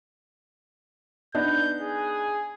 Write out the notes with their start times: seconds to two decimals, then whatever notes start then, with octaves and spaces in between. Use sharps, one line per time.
1.35 B3 D4 D#4 G6
1.81 G#4